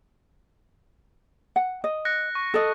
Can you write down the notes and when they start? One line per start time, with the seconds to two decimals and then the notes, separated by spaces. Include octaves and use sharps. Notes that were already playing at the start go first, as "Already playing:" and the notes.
1.56 F#5
1.84 D#5
2.05 F#6 A#6 C#7
2.35 C#6
2.54 A4 D#5